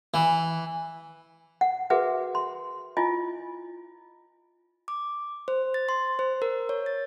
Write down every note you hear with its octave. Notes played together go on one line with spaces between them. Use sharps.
E3
F#5
F#4 G#4 A#4 B4 E5 F#5
C6
E4 F4 D#5 G#5
D6
C5
A6
C6
C5
A#4
C#5
A6